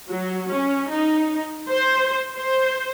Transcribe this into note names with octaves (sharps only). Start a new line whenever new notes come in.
F#3
C#4
D#4
C5
C5